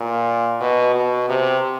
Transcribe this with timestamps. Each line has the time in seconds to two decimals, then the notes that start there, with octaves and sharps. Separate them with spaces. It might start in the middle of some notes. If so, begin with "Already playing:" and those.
Already playing: A#2
0.61 B2
0.95 B2
1.29 C3